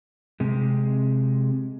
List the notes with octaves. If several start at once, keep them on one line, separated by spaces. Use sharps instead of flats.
C3 G#3